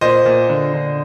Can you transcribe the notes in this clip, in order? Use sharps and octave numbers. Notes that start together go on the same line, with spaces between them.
A#2 C5 D#5
A#2
D3
D3